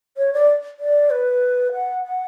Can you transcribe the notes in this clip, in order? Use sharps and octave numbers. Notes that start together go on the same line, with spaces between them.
C#5
D5
D5
B4
F#5
F#5